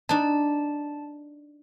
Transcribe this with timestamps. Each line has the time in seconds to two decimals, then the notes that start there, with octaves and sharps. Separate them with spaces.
0.09 D4 D#4 A5